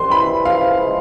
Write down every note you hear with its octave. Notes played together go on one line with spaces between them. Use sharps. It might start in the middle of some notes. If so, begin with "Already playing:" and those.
Already playing: C2 C6
E3 B5
F3 F5
G#3